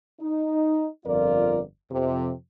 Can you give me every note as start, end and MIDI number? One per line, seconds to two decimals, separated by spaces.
0.20 0.88 63
1.06 1.59 31
1.06 1.59 41
1.06 1.59 65
1.06 1.59 70
1.06 1.59 74
1.92 2.32 41
1.92 2.32 48